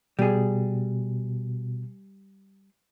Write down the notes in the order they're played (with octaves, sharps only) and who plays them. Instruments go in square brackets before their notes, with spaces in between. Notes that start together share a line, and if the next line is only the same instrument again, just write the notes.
[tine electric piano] B2 [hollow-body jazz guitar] G3 G#4